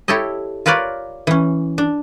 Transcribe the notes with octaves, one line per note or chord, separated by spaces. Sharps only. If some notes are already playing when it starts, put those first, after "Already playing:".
E4 G4 A4 C#5 D#5
F4 A#4 B4 C#5 D5
E3 C#4
D4